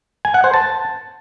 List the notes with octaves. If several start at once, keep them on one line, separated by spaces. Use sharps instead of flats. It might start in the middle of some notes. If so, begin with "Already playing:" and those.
G#5
F#5
C5
A5